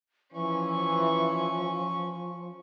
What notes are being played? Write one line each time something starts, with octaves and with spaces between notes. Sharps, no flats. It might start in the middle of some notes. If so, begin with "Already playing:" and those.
E3 F3 C#4 C#6